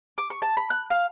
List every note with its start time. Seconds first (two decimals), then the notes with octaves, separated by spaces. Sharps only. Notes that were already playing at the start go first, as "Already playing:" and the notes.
0.18 D6
0.30 C#6
0.42 A5
0.57 B5
0.70 F#6
0.90 F5